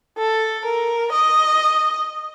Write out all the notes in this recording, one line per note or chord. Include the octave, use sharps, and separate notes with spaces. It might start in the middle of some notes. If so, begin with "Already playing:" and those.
A4
A#4
D#5